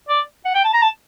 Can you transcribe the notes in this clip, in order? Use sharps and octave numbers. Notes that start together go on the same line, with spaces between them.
D5
F#5
G5
A5
A#5
A5